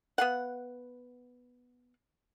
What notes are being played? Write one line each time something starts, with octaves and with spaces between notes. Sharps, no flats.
B3 F5 F#5